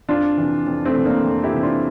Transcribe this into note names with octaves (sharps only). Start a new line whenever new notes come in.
F2 D4 F4
C3 E3
F2
A3 C4
C3 E3
A#3 D4
F2
E4 G4
C3 E3
D4 F4